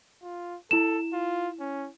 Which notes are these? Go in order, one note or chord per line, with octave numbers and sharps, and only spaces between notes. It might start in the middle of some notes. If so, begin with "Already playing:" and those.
F4
E4 A4 E7
F4
C#4